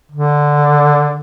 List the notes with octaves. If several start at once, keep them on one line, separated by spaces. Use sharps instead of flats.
D3